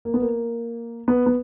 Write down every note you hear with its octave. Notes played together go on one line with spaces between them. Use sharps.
A#3
B3
A#3
B3
B3